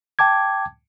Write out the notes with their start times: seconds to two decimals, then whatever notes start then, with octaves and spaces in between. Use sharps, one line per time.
0.19 G5 A5 D6 G#6